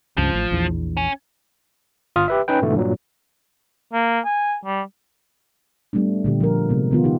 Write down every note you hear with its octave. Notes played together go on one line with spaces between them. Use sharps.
C#2 G2 F3
A1
A#1 E2
C#4
G1 F4 D#6 F6
G4 B4 E5
C#4 D#4 B4 G5
G#2 B2 D3 E3 A3
G2 A#2 F#3
A#3
G#5
G3
G3 A3 B3 D4
A#2 D3 G4
F3 F4 A#4
C3 G#3 B3
D#3 B3 F4
D#4 G4